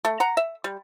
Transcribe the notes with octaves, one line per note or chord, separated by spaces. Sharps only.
A3
F#5 A#5
E5
G3